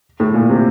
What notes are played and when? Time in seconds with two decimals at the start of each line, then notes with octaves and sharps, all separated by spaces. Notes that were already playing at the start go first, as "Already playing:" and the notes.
0.20 A2
0.34 A#2
0.49 C3